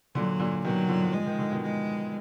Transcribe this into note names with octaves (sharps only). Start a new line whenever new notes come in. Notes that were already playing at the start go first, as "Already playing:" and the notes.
A#2 D3 F#3
A#2 D3
B2 D#3 F#3
D3 F3
F3 G#3
D#3
D3
B2 D#3
G#3